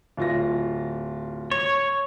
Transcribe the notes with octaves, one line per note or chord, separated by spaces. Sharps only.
D1 F4 A#6
C#5